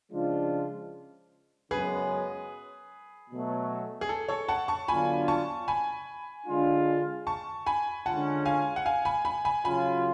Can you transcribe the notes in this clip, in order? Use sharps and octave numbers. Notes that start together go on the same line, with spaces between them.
C#3 F3 G#3 D4 F4
F#2 C#3 G#3 B3 G#4 B4
B2 F#3 A3
G#4
A4
A4 C#5
F#5 A5
A5 C#6
D3 F#3 B3 D4 F4 G#5 B5
A5 C#6
G#5 B5
D3 G#3 D4 F4
A5 C#6
G#5 B5
D3 G#3 C#4 F4 F#5 A5
F5 G#5
F#5
F5 G#5
G#5 B5
G#5 B5
G#5 B5
C#3 F#3 C#4 F4 G#5 B5